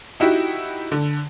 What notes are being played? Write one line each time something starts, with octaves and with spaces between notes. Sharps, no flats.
D#4 E4 F#4 G4
D3